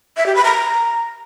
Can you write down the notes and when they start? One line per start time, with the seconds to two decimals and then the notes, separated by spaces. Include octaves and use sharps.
0.17 E5
0.26 G4
0.35 B5
0.45 A#5